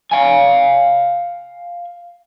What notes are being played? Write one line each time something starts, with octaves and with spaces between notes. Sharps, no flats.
F5 G#5